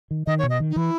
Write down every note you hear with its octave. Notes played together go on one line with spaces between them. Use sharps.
D#3
D#3 D#5
C#5
B2
D#5
D#3
D#4
E3 E4